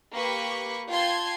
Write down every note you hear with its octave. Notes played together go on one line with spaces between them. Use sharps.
A#3 G4 B4 B5 C#6
F4 G5 A5 C6 G#6